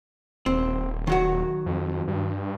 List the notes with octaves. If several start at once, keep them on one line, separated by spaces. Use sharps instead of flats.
D#1 C4
D#3 F#3 F#4
F2
G2